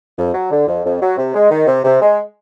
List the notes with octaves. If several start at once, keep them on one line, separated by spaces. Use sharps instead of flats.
F2
F#3
D3
F2
F2
F#3
C3
G#3
D#3
C3
C3
G#3